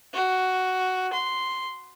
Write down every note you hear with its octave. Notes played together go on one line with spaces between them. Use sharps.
F#4
C6